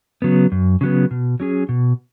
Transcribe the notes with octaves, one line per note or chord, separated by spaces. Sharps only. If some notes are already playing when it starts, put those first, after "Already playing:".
C#3 F#3 B3
F#2
C#3 F#3 B3
B2
F#3 C#4 G#4
B2